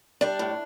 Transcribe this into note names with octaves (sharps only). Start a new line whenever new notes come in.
G3 D4
A2